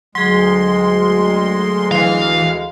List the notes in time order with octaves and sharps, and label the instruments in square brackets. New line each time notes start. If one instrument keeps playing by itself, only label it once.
[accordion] D2 G#3 [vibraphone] F#3 G#4 [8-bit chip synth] C6
[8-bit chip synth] E3 [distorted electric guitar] F5